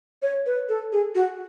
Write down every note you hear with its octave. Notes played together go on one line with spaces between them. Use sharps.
C#5
B4
A4
G#4
F#4